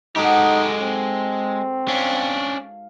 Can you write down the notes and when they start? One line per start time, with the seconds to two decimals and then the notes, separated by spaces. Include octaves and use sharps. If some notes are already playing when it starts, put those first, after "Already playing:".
0.16 G#2 G#3 D#4 F#4 G4 A4
0.82 C4
1.88 C#4 D4 F5